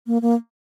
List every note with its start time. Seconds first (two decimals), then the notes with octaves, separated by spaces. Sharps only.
0.07 A#3
0.22 A#3